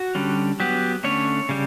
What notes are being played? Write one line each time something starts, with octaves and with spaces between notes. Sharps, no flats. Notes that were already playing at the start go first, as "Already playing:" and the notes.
Already playing: F#4
D3 G3 C#4
F#3 B3 G4
D3 A3 C#4 C#5
C#3 G3